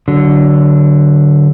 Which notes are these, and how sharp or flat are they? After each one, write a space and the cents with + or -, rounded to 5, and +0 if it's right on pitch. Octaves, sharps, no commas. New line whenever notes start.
D3 +0 F#3 +20